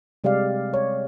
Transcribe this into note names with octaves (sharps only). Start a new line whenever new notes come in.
C3 G3 G#3 G4 D5 F5
C#5